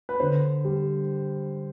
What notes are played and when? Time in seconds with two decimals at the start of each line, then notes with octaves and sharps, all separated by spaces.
0.09 B4
0.20 D3 C5
0.65 G3